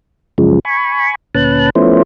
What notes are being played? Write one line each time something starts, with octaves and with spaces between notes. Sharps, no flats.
F#2 C#3 F3 G#3
G#5 B5 C#6
D2 A#2 C#4 B4 A5 F#6
F3 A3 B3 C#4 E4 C5